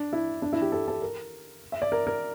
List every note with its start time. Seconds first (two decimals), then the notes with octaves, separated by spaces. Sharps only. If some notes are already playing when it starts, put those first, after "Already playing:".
Already playing: D4
0.13 E4
0.42 D4
0.53 E4
0.62 G4
0.72 A4
0.88 A4
1.02 A#4
1.72 E5
1.82 D5
1.92 A#4
2.07 A#4